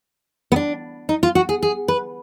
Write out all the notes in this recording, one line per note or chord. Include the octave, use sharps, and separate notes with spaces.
B3
D4
D#4
F4
F#4
G#4
G#4
B4